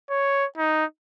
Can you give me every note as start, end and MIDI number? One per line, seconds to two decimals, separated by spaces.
0.10 0.45 73
0.57 0.85 63